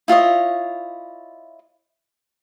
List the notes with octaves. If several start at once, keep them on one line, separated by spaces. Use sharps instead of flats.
E4 F4 C#5 D#5